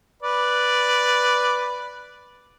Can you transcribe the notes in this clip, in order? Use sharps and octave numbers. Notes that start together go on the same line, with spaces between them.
B4 D5